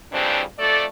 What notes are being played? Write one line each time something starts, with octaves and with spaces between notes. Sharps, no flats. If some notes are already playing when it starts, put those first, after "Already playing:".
F2 C#3 E3 G3 C4 D4
F2 A3 A4 D5